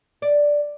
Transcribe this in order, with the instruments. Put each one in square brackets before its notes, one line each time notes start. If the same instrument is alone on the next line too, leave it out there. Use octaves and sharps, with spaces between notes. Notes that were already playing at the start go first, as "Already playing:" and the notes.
[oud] D5